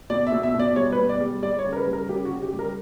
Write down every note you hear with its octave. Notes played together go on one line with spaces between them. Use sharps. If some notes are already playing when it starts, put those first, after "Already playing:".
B2 D5
E5
B2
E5
B2
D5
G3 C#5
B4
B2
D5
G3
G3 D5
C#5
C#3
A#4
B4
G3
A#4
C#3 G4
F#4
C#3
G4
G3
A#4